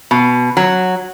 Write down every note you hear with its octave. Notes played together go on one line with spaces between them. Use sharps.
B2
F#3